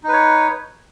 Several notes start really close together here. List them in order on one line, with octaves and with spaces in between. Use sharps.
D#4 B4 C#5